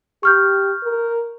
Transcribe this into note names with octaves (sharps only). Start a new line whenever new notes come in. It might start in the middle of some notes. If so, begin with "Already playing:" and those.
G4 C#6 F6 G6
A#4